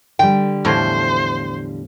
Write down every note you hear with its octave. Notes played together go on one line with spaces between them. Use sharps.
D3 G3 G5
E2 A2 F3 C5